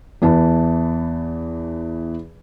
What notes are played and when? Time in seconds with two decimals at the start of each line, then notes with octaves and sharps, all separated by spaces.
0.22 E2 E3 A5